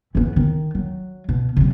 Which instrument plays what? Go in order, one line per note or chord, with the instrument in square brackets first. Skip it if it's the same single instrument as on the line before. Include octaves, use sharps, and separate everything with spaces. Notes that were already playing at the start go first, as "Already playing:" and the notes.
[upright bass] E3 B3
D#3
F#3
B2
C3 F#3